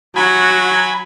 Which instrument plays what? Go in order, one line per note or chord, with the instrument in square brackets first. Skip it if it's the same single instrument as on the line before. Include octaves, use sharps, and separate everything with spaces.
[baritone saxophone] F#3 [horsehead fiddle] F#4 [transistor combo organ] G#5 B5